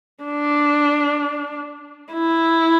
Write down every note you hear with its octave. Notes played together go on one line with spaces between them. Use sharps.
D4
E4